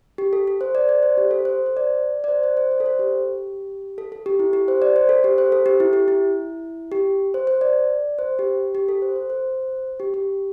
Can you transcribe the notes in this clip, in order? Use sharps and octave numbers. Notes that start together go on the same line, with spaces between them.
G4
A4
A4
C5
D5
D5
C5
G4
A4
C5
C5
D5
D5
C5
C5
C5
D5
A4
C5
G4
A4
A4
G4
E4
G4
C5
D5
C5
A4
G4
C5
A4
G4
E4
G4
E4
G4
C5
C5
D5
C5
G4
G4
A4
C5
C5
C5
G4
G4